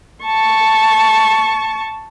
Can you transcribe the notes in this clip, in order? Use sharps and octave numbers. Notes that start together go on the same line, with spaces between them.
A5 C#6